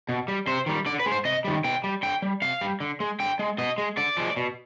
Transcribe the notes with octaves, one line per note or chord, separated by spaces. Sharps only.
B2
G3
C3 C5
D#3 G3
D3 D5
B4
G#3
C5
C3 D#5
D#3 G3
B2 G5
G3
D3 G5
G3
C3 F5
G3
D3
G#3
D3 G5
G#3
B2 D#5
G#3
D3 D5
F3 G#3
B2